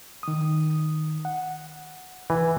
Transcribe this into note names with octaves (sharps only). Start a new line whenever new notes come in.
D#3 D#6
F#5
E3 B4